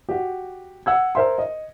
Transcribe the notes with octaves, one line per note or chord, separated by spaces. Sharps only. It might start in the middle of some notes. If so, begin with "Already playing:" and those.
F#4 G4
F#5 E6 G#6
A#4 C5 E5 C6
D#5